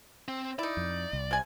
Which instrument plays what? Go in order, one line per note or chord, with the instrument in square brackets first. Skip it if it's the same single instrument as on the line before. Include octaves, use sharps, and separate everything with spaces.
[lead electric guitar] C4
[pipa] D#4 E4 [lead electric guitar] D5
[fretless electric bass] F2
C2
[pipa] C3 G#5